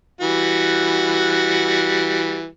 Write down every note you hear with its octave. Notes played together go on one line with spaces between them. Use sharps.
E3 G3 F#4